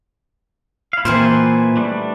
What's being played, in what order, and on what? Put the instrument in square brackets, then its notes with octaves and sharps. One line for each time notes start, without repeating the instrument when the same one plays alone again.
[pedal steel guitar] E4 F5
[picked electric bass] A#2 [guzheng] E3 C4 E4 [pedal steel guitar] G#4 B4 C5
[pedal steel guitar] G3 A3 D4